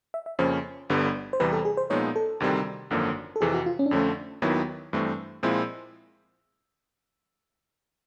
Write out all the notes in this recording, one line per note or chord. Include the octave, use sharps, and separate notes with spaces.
E5
E5
F2 C#3 F3 A#3 C#4 C5
G1 G2 D3 G3 B3
C5
E2 C3 E3 G3 B4
A4
G#4
C5
A#2 F3 G#3 B3 D#4 C#5
A4
D2 C3 D#3 G3 C4
G#1 F#2 D3 F3 A#3
A4
F2 C3 E3 G#4
F#4
F4
C#4
D4
F2 D3 F3 A3 C#4
D#2 D#3 F#3 B3 E4
G2 E3 A3 C4
A#2 F3 G#3 C4 E4